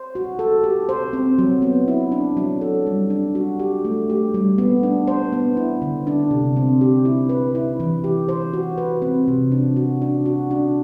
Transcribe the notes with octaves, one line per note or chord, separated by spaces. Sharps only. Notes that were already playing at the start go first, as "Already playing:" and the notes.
Already playing: C5
F#4
A4
G4
C5
C4
F#3
B3
E4
D4
F#3
A4
G3
D4
F#4
G4
A3
G4
G3
B3
D4
C5
B3
E4
D3
D4
C3
C4
G4
E4
B4
E4
E3
G4
C5
F#4
B4
C4
C3
D4
F#4
D4
F#4
D4